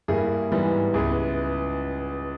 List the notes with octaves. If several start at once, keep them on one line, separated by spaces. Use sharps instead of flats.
G2 G3 A#3 E4 G#4
G#2 E3 G3 B3
C#2 C#3 G#3 B3 E4 G#4